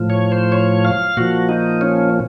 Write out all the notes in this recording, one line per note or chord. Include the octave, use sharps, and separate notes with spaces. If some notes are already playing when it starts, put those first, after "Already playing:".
Already playing: A2 F3
C#5
C5
C#5
F5
A#2 F3 F#4
D#4
C#4